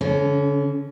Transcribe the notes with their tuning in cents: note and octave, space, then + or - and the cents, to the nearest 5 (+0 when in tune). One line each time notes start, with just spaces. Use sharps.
D3 -40 C#4 +0